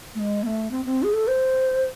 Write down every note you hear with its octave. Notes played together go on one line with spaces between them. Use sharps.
A3
G#3
B3
A3
C4
C4
G#4
A4
C5